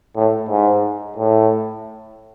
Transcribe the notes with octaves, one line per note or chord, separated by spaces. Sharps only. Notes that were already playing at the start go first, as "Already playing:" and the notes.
A2
G#2
A2